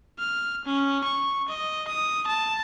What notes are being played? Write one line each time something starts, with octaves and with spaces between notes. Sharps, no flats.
F6
C#4
C#6
D#5
D#6
A5